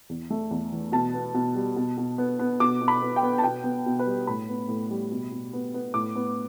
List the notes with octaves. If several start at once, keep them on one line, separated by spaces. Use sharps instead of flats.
E2
A3
E2
E3
B2 A5
B3
B2
G3
B2
B2
B3
B3
B2 D6
B2
B5
B3
G5
B3
A5
B2 G5
B3
B2
B4
G3
A2 B5
B3
A2
G3
B2
B2
B3
B3
A2 D6
B3